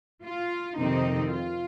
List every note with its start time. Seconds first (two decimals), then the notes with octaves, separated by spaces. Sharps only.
0.25 F4
0.78 F2 C3 D#3 C4 D#4
1.34 F4